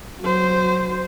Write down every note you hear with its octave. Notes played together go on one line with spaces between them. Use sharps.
F#3 C5